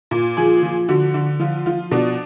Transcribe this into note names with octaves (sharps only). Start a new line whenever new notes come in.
A#2
F3 G#4
F3
D3 F#4
D3
F3 F4
F3 F4
B2 D4